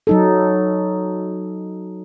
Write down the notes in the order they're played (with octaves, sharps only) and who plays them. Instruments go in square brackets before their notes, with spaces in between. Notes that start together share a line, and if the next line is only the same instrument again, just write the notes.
[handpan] F#3 D#4 A4